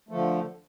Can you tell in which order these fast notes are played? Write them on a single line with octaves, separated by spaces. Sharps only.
A3 F3 D3